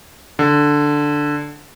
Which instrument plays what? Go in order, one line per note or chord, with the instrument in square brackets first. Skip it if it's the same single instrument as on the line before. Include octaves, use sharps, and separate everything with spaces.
[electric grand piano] D3